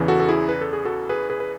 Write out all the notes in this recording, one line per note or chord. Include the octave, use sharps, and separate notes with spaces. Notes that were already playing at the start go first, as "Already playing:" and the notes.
Already playing: E2 C#3 E3
F#4 A4
A4
E4 G#4
B4
A4
G#4
F#4 A4
G#4 B4
G#4 B4
B4